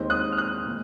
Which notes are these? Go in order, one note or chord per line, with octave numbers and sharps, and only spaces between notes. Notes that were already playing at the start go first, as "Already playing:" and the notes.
Already playing: D#2 D#3 G#3 C4
D#6 F#6
F6
D#6 F#6
A#2 G#3